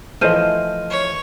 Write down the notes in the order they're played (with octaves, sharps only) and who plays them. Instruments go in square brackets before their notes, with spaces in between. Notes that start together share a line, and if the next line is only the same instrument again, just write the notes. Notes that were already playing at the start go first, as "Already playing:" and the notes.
[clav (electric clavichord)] E3 F3 A3 [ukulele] C5 D#5 [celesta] F6 D#7
[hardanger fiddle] C#5